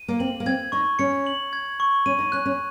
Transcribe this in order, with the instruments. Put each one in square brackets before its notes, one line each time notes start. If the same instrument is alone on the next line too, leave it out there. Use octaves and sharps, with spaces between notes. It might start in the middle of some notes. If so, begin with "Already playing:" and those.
Already playing: [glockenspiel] D#7
[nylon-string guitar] A#3
[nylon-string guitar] C4 [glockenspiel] F#7
[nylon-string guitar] A#3
[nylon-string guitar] C4 [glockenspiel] G#6
[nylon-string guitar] D#4 [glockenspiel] C#6
[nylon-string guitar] C#4 [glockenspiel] C#7
[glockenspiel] F#7
G#6
C#6
[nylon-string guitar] C#4 [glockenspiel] D#7
[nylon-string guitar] D#4
[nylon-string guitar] C#4 [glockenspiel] F#6
[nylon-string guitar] C#4